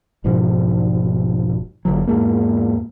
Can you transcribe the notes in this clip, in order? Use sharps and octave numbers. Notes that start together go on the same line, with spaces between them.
E1 G#2 B2 F3
F#1 D3 F#3
E2 G#2 G#3 A#3